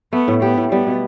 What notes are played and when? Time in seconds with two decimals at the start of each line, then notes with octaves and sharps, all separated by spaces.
0.12 A3 B3
0.28 A2
0.42 B3 G4
0.57 A2
0.71 G3 B3
0.87 B2